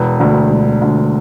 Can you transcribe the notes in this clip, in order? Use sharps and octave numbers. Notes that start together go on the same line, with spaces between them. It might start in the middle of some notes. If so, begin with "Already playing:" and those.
Already playing: E1 B4
D2 D3
E1
D2 D3